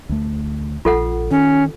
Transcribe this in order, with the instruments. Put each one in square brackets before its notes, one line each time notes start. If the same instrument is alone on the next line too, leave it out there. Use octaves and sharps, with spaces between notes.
[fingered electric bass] D2 A3
[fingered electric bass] A#1 [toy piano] F4 A4 F#5
[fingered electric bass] D#3 [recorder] C#4